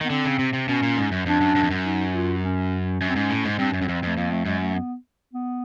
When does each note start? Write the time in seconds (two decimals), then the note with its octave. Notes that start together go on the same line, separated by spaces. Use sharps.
0.01 D#3
0.05 B3
0.10 D3 C4
0.25 C#3
0.39 C3
0.53 C3
0.68 B2 C#4
0.83 A#2
0.97 G#2
1.12 F#2
1.26 F2 D4
1.41 F#2
1.56 F#2
1.63 F2
1.71 F#2
1.85 D#4
2.14 F4
2.43 C#4
3.00 F#2 C#4
3.09 C4
3.16 G#2 C#4
3.30 A2
3.45 G#2
3.58 G2 C4
3.71 F#2 C#4
3.82 F#2
3.84 F2 C4
4.03 F2 A3
4.17 F2 A#3
4.31 A3
4.45 F#2 G#3
4.61 A3
4.75 B3
5.33 B3